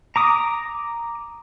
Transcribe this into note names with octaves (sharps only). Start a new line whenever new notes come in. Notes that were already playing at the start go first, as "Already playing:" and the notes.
A#5 D6 D#6